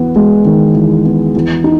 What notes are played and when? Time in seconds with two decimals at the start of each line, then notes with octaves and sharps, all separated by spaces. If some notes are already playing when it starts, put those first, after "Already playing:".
Already playing: E2 B3
0.16 G#3
0.45 D#3
0.74 E2
1.05 B3
1.35 E2
1.64 D#4